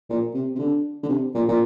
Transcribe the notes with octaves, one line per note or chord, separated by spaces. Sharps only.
A#2
C3
C3
D3
D3
C3
A#2
A#2